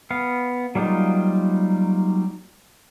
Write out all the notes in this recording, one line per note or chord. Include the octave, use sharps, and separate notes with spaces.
B3 F5
F#3 G3 A#3 D#4 F4